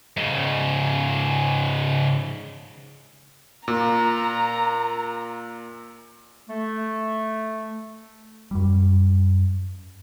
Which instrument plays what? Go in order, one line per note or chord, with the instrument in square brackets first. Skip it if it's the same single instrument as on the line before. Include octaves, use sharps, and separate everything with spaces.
[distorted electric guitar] G#2 C#3
[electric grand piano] A#2 [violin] A#5
[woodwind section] A3
[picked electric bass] F#2 G3